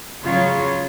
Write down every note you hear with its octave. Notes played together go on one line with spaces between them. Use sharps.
C#3 F#3 F4 C#5